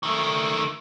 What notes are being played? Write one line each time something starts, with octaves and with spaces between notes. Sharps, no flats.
D#3 A3